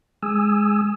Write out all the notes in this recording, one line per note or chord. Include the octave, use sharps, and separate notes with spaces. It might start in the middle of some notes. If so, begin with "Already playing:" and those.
G#3 G#5 D#6 E6